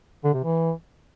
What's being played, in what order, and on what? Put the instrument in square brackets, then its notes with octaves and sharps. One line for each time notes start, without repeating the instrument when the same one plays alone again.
[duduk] D3
C3
E3